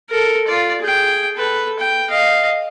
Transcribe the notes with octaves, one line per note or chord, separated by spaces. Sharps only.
A4 A#4
F4 D5
G#4 G5
A4 B4
G5
D#5 F5